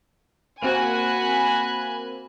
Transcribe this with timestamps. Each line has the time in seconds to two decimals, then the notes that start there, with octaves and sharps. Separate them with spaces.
0.62 A#3 C4 F#4 G#5 B5 F#6